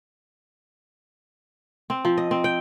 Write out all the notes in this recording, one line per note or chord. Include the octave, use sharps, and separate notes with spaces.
C4
F3
D#5
C4
G5